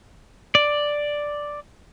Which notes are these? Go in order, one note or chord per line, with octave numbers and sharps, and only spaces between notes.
D5